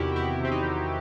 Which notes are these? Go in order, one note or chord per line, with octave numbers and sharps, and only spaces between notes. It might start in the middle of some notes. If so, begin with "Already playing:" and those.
Already playing: E2 C3 D#3 E4 F#4 G4
E2 E4
C3 C4
D#4
D#3